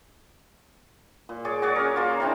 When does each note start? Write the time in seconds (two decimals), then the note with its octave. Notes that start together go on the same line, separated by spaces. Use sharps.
1.29 A#2
1.45 G#4 C#5 D5
1.62 F#4 G#4 C#5 D5
1.76 C#4 A#4
1.96 A#3 F4
2.20 E3 C4 D4